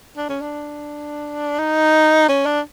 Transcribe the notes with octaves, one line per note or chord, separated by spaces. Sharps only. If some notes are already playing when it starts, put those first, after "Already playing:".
D4
C#4
D4
D#4
C#4
D4